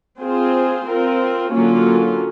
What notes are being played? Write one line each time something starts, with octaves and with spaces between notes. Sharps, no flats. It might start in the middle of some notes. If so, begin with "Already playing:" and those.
C4 F4 G#4 C5
C4 F4 A#4
D3 F#3 A#3 C#4 F4